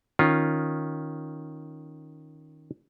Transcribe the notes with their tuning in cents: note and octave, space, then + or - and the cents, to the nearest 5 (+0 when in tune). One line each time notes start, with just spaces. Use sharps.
D#3 +0 C#4 +0 F4 +0